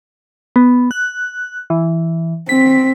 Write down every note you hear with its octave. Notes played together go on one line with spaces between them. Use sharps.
B3
F#6
E3
C4 B6